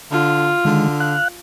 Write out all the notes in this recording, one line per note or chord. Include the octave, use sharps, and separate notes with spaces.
D3 F4
D3 D#3 G#3
F5 F#6